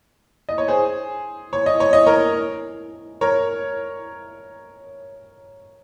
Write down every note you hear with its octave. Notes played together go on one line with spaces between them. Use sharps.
D#5
C#5
G#4 C5
C#5
D#5
C#5
D#5
A#4 C#5
A#4 C#5